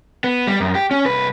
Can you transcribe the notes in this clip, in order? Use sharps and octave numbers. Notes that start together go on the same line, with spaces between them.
B3
G3
F#2
G4
C#4
C2 B4